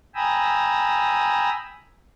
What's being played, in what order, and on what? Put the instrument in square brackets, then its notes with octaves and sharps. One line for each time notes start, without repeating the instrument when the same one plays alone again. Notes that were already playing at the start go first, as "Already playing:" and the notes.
[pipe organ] G5 G#5 A#5 B5 D#6 E6